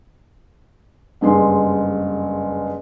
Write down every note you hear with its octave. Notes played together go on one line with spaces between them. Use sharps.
F#1 G2 G#3 C6